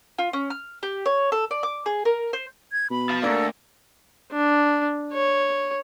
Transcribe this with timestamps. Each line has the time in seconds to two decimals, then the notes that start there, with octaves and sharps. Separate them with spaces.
0.18 F4
0.33 C#4
0.50 F6
0.83 G4
1.06 C#5
1.32 A4
1.51 D5
1.63 D6
1.86 G#4
2.05 A#4
2.33 C5
2.72 G#6
2.91 B2 B5
3.10 F4 A5
3.22 D2 A#3 D4 A4 A#4
4.32 D4
5.13 C#5